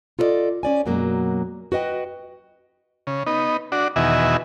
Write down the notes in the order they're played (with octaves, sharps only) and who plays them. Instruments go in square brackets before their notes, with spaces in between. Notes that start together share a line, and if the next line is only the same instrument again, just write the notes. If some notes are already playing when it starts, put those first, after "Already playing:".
[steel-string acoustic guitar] F4 A4 A#4 D5 D#5
C#4 D5 G#5
F#2 B2 F#3 G#3 A#3
F#4 B4 D#5 G5
[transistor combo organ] C#3
B3 D#4
D4 F#4
E2 B2 D#3 F#4 E5 G#5